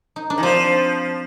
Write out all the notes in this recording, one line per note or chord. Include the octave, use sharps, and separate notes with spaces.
D#4
D4
D#3
F3 C4